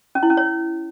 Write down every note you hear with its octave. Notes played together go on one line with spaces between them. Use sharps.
C#4
E4
C#4
C#5